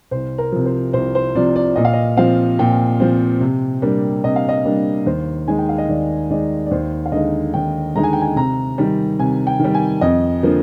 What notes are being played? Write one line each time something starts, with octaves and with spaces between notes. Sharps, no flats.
C2 C5
A#4
C3 F3
C5
C2 C5
C5
C3 F3 D5
D5
A#2 D#5
F5
D#5
F3 C4 F5
A#2 G5
F3 C4
C3
G3 A#3 D4
C3 D#5
F5
D#5
G3 A#3 D4
D#2 C5
D#3 G#3 D#4 G#5
G5
F5
D#5
D#2 D5
D#3 G#3 D#4 D5
D5
D#2 C5
F5
D3 G#3 D#4 D#5
D#2 G5
D3 G#3 D#4 A#5
G#5
G5
G#5
C3 A#5
D#3 G3
C3 G#5
G5
D#3 G3
G#5
F2 D#5
D3 F3 A#3